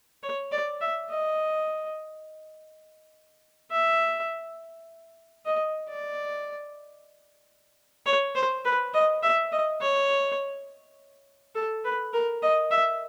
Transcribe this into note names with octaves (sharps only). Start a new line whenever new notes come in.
C#5
D5
E5
D#5
E5
D#5
D5
C#5
C5
B4
D#5
E5
D#5
C#5
A4
B4
A#4
D#5
E5